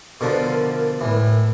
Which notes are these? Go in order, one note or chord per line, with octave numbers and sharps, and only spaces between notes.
B2 D3 F3 A#4
A2 E3